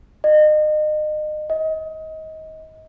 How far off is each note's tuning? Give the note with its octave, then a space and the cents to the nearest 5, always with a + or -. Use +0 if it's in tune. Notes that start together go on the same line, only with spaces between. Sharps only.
D#5 -30
D#5 +25